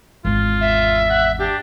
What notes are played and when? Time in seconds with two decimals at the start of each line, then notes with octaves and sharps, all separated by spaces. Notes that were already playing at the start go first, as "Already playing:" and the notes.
0.25 G#1 E2 F4
0.61 E5
1.10 F#5
1.39 D4 G4